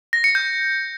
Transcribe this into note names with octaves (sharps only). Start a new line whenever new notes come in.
A#6
C#7
G6